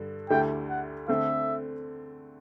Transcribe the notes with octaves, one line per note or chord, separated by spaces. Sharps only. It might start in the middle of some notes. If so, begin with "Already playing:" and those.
Already playing: G2 D3
D2 D3 A3 E4 G4 G5
F#5
D3 A3 C4 E5